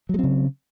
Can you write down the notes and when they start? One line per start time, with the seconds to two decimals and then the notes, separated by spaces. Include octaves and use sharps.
0.09 F#3
0.14 G#3
0.19 C4
0.24 C#3